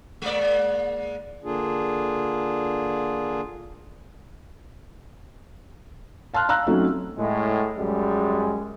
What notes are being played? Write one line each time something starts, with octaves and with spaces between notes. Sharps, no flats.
G#3 A#3 D5
D3 A#3 D4 F4 G#4
F5 A5 C6 F6 F#6
F5 A#5 E6 F#6
F#3 A3 C4 C#4 D#4 F#4
A2 G#3
F#2 G3 G#3